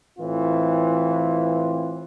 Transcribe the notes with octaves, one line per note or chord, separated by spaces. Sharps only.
A2 E3 C4 F4